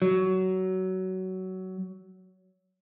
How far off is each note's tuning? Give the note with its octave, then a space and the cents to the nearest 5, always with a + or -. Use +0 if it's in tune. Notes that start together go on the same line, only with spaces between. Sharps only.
F#3 +20